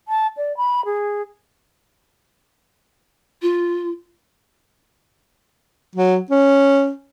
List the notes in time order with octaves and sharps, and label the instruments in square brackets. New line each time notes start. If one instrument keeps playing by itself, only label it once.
[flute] A5
D5
B5
G#4
[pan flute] F4
[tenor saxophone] F#3
C#4